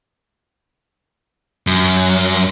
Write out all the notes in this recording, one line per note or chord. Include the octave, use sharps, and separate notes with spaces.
F#2